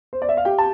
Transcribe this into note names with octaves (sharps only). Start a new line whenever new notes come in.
C5
D5
E5
F5
G4 G5
A5